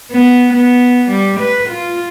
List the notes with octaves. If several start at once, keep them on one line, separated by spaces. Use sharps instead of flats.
B3
B3
G3
B4
F4